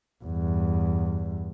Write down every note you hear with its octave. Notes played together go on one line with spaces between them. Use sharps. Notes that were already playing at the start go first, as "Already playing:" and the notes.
E2 G2